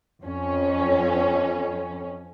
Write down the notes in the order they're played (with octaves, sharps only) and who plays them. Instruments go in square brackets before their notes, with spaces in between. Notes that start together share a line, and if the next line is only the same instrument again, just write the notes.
[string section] F2 C#4